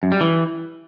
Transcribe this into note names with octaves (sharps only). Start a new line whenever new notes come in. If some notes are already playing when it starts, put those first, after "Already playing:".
F#2
G3
E3